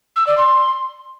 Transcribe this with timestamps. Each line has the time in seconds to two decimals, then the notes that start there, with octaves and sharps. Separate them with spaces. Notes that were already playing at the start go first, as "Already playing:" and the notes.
0.16 E6
0.27 D5
0.37 C6